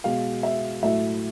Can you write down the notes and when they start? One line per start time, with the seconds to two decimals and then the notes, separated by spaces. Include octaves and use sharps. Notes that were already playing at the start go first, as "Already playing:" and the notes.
0.04 B2 G#3 F5
0.43 E5
0.83 A2 F#3 A3 E5